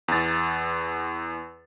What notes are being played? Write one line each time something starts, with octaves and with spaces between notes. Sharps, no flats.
E2 A6